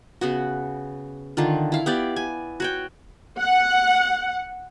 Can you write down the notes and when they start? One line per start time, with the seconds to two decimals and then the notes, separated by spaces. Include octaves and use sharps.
0.21 C#3 B3 F#4
1.37 D3 D#3 F4
1.72 E4 F5
1.86 B3 G4 D5
2.16 G#5
2.60 F#4 C#5 G5
3.39 F#5